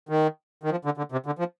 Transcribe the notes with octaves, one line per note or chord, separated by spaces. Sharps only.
D#3
D#3
F3
D3
D3
C3
D3
F3